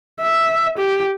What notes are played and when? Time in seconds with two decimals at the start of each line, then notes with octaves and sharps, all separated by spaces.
0.22 E5
0.78 G4